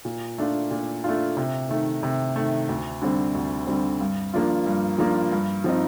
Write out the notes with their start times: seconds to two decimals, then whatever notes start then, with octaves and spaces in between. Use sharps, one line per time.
0.05 A#2
0.38 A3 D4 F4
0.71 A#2
1.04 A3 D4 F4
1.37 C3
1.69 D#3 A3
2.03 C3
2.36 D#3 A3
2.69 D2
3.02 D3 G3 C4
3.35 D2
3.67 D3 G3 C4
4.01 G2
4.34 F3 A#3 D4 F4
4.66 G2
4.98 F3 A#3 D4 F4
5.32 G2
5.64 F3 C4 D#4